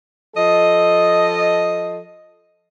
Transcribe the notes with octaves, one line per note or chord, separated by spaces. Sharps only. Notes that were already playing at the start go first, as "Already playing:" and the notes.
F3 A4 D#5